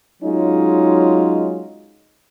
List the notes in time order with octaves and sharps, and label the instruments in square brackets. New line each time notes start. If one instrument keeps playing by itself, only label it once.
[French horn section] F#3 G#3 C#4 D#4 F4